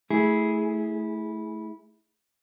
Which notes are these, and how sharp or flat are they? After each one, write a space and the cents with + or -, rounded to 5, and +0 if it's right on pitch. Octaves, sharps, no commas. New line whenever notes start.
A3 -5 E4 -15 G#4 +0